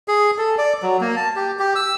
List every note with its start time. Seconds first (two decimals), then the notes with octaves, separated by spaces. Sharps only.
0.08 G#4
0.38 A4
0.58 D5
0.82 F#3
1.01 A#3
1.16 A5
1.36 G4
1.59 G4
1.76 E6